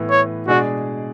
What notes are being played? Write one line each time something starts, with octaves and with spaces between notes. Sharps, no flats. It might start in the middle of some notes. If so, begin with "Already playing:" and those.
Already playing: A2 E3 B3
C#5
B2 G#3 D4 F#4 G#4 D5